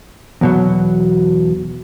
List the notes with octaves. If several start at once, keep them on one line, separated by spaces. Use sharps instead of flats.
E2 B2 F#3